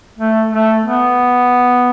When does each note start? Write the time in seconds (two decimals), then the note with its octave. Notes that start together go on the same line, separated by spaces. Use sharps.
0.18 A3
0.50 A3
0.82 B3